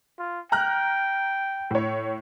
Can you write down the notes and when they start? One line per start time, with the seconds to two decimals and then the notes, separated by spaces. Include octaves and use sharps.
0.19 F4
0.52 G5 A#5 F6 F#6
1.71 A2 C#5